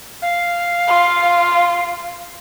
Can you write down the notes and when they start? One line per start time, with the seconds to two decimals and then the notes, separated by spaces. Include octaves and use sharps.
0.22 F5
0.88 F4